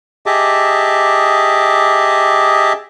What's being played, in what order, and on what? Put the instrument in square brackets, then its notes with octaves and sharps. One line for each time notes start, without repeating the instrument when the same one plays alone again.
[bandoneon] G4 G#4 D#5 E5 A5 D6